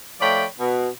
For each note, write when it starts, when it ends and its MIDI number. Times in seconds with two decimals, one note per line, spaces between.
0.21 0.45 53
0.21 0.45 57
0.21 0.45 73
0.21 0.45 74
0.21 0.45 79
0.21 0.45 83
0.59 0.88 47